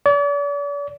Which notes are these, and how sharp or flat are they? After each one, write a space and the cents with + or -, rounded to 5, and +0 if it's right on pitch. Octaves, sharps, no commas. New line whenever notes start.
D5 -45